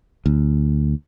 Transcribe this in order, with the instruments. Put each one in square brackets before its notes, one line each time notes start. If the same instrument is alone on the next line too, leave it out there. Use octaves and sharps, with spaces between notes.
[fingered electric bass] D2